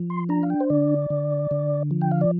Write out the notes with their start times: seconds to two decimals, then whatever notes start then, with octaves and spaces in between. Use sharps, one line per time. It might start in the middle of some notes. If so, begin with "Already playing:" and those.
Already playing: F3
0.10 C6
0.29 D4 A#5
0.43 F5
0.50 G5
0.60 C5
0.70 D3 D5
1.10 D3
1.51 D3
1.91 F3
2.01 G5
2.11 F5
2.21 D5